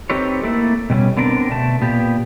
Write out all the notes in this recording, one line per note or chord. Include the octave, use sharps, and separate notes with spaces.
C4 D#4 G4 A4 B4 C#5
A3 A#3 E4 A4
B2 G3 A#3 C#4
D3 B3 C4 D4 A#4
B2 A3 A5
A#2 B3 G4